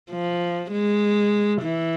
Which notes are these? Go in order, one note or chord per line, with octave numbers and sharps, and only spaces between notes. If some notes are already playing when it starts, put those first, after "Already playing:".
F3
G#3
E3